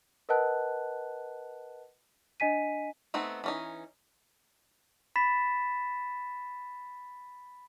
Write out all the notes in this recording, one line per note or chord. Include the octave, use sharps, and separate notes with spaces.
A#4 B4 D#5 F#5 A5 F#6
D4 D#5 G#5 B6 D#7
A3 B3 C4 D#4
E3 C#4 D#4
B5 A6 B6 E7